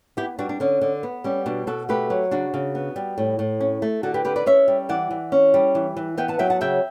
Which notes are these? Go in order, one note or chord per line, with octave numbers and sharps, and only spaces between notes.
B3 E4 G4
G3 D4 F#4
D4
D3 C#4
D3
B3
G3 C#4
B2 D4
B2 F#4 A4
A3 G4 B4
F#3
C#3 D4 F#4
C#3
B3
G3
A2
A2
C#4
A3
D3 F#4 A4
G4 B4
D3 G4 B4
B4 D5
C#4 C#5 E5
G3
E3 D5 F#5
E3
C#4
G3
E3
E3
B3 E5 G5
F#5 A5
F#3 E5 G5
F#5 A5
C#3 E5 G5